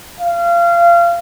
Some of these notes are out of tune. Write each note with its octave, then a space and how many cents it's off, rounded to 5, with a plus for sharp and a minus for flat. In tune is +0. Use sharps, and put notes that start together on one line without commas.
F5 -25